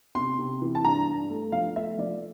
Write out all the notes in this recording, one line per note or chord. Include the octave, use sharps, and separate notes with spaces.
C3 C6
C3
E3
A5
G2 A#5
G2
A3
F3 F5
A3 E5
F3 D5